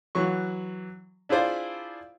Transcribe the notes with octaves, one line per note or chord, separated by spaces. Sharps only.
E3 F#3 C#6
D4 E4 F4 G#4 C5 D5